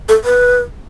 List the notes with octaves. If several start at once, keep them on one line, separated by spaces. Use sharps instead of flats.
A4
B4